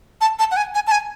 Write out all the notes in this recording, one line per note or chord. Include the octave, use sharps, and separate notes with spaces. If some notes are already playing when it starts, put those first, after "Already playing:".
A5
A5
F#5
G#5
G#5
A5
G#5